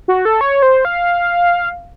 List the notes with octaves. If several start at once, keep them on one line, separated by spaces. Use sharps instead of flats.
F#4
A4
C#5
C5
F5